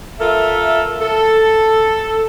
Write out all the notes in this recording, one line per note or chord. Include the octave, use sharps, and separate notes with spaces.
F4 A4 A#4 E5
A4